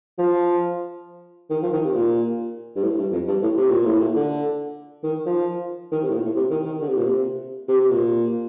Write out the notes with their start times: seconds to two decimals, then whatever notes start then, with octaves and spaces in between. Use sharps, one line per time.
0.18 F3
1.50 D#3
1.62 F3
1.73 D#3
1.84 C3
1.94 A#2
2.76 G2
2.83 A2
2.97 G2
3.12 F2
3.28 G2
3.42 A2
3.57 C3
3.70 A#2
3.85 A2
3.98 A#2
4.16 D3
5.03 D#3
5.26 F3
5.92 D#3
6.03 C3
6.08 A2
6.14 A#2
6.25 A2
6.36 C3
6.51 D#3
6.65 D#3
6.81 D3
6.89 C3
6.97 A#2
7.05 C3
7.68 C3
7.80 C3
7.90 A#2